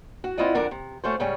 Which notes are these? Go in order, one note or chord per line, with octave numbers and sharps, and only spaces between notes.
F#4
C4 E4 F4 D5 D#5 F#5
F2 D3 A#4 D5 F#5 A#5
C3
A3 C#4 F#4 C5
G#2 C#3 G3 C#4